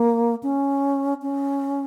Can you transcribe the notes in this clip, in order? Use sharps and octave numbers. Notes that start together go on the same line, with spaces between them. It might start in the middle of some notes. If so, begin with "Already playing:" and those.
Already playing: A#3
C#4
C#4